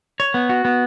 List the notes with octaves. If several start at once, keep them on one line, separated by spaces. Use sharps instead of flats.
C#5
B3
F#4
B3